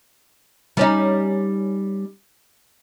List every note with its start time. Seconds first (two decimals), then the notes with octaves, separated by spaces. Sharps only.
0.77 G3 C#4 D#4